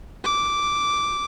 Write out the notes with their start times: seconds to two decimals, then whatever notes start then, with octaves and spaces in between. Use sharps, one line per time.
0.25 D6